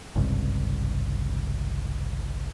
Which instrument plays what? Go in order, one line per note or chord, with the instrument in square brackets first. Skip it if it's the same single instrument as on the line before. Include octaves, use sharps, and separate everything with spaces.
[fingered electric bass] G#1 C#2 G2 C3